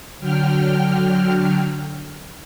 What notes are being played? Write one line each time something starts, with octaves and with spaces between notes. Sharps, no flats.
D3 F#3 G5 F6